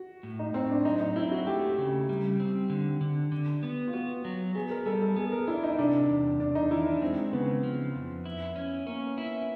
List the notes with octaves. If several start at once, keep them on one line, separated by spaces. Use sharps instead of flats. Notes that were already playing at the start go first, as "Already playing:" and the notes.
Already playing: F#4
A2
D#4
A2 C4
D4
F#3 D#4
D#4
C4 E4
F#4
A3 G4
C#3
G3
C4
D3
D3
D3
B3
F4
B3 F#4
F#3
B3 G#4
A#4
G3 A4
A4
B3 G#4
A#4
D4 E4
D#4
C3 D4
E2
E2 D4
D#4
D#3 E4
D4
G#3 C4
C#3 B3
F3
F2
E4
C#4
A#3 C#4
E4